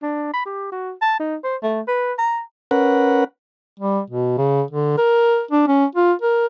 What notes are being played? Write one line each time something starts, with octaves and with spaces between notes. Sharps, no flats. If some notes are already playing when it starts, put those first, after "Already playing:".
D4
B5
G4
F#4
A5
D#4
C5
A3
B4
A#5
C#4 A#4 B4 F#5
G3
B2
C#3
D3
A#4
D4
C#4
F4
A#4